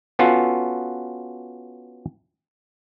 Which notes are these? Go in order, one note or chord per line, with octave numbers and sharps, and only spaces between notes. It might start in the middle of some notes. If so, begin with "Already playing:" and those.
B3 C#4 F4 F#4 A4